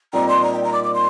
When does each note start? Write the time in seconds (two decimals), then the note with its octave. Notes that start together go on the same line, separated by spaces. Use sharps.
0.13 A#2 G3 C4 D#4 A#5
0.28 C6
0.43 A#5
0.53 G5
0.64 A#5
0.73 D6
0.84 D6
0.94 C6